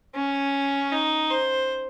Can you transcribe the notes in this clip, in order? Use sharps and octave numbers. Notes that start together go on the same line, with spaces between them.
C#4
D#4
C5